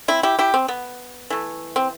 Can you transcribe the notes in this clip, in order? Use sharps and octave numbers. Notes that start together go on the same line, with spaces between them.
C4 E4
E4 G4
E4 G4
C4
B3
E3 A3
C4